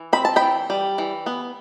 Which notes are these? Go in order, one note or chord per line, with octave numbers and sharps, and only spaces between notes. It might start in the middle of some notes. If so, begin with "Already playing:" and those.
Already playing: E3
C4 B5
A5
E3 G5 B5
G3
E3
B3